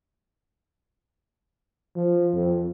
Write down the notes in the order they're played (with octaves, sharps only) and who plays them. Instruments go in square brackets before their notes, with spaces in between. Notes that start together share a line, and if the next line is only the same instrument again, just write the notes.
[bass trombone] F3
F2